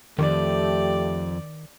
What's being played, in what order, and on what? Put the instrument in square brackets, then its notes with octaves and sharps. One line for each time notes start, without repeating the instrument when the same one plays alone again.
[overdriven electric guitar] F2 [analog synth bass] D#3 [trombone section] A3 G4 [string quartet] D5